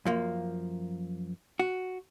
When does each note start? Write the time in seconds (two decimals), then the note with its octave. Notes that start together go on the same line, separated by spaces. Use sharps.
0.06 F#2 F3 A#3
1.59 F#4